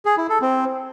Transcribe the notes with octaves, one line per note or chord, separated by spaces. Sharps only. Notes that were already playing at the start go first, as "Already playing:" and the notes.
G#4
E4
A4
C4